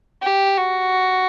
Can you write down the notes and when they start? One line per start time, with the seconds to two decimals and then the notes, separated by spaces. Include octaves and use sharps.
0.22 G4
0.58 F#4